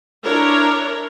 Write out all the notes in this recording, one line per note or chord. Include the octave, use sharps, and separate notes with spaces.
D4 E4 A#4 C#5